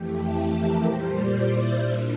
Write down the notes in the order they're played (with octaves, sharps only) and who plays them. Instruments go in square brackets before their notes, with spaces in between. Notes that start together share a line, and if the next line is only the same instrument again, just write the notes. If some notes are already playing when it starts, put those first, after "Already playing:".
Already playing: [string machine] F2 E3 A3 G4
A4
A#4
A#2 G3 C5
D5
E4
A#2 G3 D4